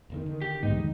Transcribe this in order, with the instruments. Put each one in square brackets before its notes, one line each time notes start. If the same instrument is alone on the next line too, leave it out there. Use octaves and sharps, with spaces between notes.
[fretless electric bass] F1 E2 D#3
D3 D#3
[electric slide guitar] G4
[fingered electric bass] A#1 G#2 [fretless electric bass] D3 G#3 B3 [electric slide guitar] D#4
[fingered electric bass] D2 E3 F3